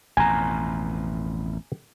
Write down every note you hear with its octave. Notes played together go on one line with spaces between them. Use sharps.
A1 F2 B2 G#5 A#5